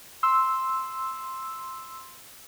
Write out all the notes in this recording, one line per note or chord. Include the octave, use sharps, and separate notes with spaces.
C6 E6